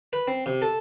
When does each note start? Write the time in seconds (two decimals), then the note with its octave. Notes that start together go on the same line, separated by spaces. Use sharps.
0.13 B4
0.28 C4
0.46 C3
0.62 A4